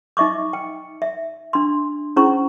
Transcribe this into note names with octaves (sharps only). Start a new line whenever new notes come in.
D#4 D#5 E5 C#6 D6
G5
E5
D4 C6
C#4 E4 G#4 C5 A#5 C#6